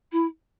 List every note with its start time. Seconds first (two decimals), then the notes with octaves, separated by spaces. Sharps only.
0.12 E4